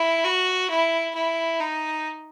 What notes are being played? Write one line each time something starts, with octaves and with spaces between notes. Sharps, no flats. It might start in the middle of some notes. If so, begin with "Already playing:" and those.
Already playing: E4
F#4
E4
E4
D#4